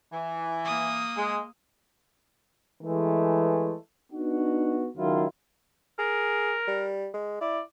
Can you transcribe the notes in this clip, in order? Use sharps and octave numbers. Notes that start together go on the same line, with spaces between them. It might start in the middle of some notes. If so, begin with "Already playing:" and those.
E3
A#3 D#6
G#3
E3 G#3 A3
B3 D4 D#4 F#4
C#2 D#3 F#3 E4 F4
G#4 A#4
G3
G#3
E4 D5